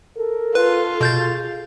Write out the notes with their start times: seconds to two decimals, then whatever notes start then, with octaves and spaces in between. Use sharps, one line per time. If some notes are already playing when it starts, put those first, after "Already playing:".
0.17 A4 A#4
0.55 F4 B4
1.01 B2 G#4 G6 A6